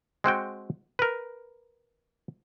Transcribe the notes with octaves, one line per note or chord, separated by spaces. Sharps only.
G#3 C4 F#4 G5
A#4 B4